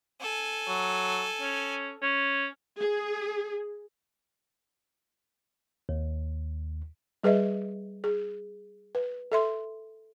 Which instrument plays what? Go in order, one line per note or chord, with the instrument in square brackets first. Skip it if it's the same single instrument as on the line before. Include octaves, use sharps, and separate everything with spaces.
[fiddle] A4 G#5
[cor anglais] F#3
C#4
C#4
[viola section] G#4
[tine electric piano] D#2
[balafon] G3 G#4 B4 D#5 E5
G#4
B4
A4 E5 C6